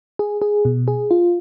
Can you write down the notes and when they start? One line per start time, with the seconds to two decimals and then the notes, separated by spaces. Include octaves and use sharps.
0.19 G#4
0.42 G#4
0.65 B2
0.88 G#4
1.11 F4